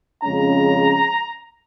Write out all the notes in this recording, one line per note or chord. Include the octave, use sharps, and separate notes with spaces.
F2 C#3 G#3 C#4 A#5